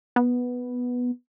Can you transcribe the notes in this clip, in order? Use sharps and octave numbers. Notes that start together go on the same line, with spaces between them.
B3